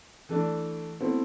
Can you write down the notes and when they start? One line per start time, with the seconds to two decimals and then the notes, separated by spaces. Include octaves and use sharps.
0.29 E3 A3 D4
1.00 B2 A3 C4 E4